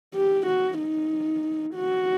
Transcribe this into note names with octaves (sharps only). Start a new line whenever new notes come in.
G4
F#4
D#4
F#4